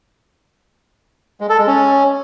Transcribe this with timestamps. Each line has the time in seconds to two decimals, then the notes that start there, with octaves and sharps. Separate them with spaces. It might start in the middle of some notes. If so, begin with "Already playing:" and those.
1.41 G#3
1.49 A4
1.58 G#3
1.67 C#4